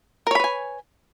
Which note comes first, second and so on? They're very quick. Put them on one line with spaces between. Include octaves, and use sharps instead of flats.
A#4 C#5 B5 B4 G#5